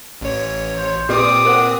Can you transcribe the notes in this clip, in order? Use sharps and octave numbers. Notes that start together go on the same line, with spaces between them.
A1 C#5
C5
A#2 C4 G4 B4 D5 D6 D#6
A#4 C5 F#5